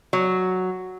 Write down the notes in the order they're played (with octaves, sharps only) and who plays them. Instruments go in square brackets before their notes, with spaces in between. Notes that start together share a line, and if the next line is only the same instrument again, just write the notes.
[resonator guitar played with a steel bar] F#3